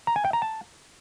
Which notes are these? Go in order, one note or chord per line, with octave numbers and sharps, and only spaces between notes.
A#5
G#5
G5
A#5
A5